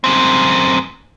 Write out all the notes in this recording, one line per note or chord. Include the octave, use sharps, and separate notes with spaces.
F#2 C4